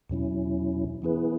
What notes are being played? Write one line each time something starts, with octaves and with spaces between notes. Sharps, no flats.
E2 B2 F#3 C#4 E4
E3 B3 E4 G#4 B4